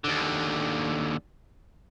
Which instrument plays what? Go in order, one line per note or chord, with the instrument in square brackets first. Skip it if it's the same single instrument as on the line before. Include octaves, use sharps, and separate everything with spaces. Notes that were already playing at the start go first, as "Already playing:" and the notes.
[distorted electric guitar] D#2 D3